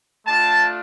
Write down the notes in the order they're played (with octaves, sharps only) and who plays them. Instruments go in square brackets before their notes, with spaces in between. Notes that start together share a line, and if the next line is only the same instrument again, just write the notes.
[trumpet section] A3 D4 F4 A5